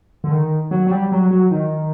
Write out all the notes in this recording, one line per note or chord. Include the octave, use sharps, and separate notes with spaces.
D3
D#3
F#3
F#3
G3
F#3
F#3
D#3